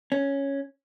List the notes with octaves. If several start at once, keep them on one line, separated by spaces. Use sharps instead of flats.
C#4